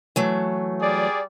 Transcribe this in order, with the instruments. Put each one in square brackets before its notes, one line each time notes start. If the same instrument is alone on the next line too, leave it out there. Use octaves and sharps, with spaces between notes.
[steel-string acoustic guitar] E3 F#3 A3
[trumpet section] G3 G#4 D5